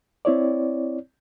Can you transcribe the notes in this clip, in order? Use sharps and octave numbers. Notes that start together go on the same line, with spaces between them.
C4 E4 C#5 D5